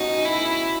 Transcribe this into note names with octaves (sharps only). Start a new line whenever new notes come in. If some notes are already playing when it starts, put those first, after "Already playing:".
Already playing: B2 A3 C#4 D#4 F#4
E4